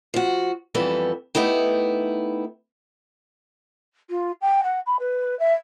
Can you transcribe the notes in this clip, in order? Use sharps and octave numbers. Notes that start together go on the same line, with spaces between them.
F3 F#4
F2 E3 G3 B3 A4
A3 B3 D#4 E4 G4
F4
G5
F#5
B5
B4
E5